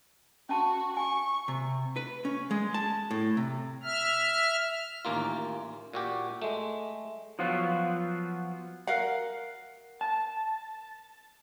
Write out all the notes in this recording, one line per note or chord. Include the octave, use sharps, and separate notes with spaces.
C#4 F#4 A5 C6
G#5 C#6
C3
B4
C#4
G#3
A5
A2
C3
E5 F6
A1 D#2 A#3 F4
A#2 F#4 G4
G#3 A3
F3 F#3 B3 F4 F#4
A#4 F5 F#5
A5